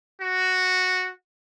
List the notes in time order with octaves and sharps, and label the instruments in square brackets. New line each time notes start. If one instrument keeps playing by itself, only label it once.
[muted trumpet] F#4